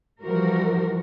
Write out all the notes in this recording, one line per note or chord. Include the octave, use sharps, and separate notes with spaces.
E3 F3 G3 F#4 A#4